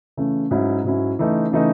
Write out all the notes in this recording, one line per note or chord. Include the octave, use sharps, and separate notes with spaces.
C#3 E3 A3 C#4
G#2 F#3 C#4 E4
G#2 F#3 C#4 E4
C#3 E3 A3 D#4
C#3 E3 A3 D#4